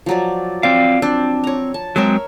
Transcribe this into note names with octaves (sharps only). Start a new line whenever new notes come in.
F3 F#3 D5
C4 D5 F5 D6
C4 D4
C#5 A#5
A5
F#3 G#3 C4 A#4 C#5 E5